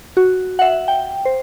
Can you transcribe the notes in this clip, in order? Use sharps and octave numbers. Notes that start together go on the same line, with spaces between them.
F#4
E5 F#5
G5
C5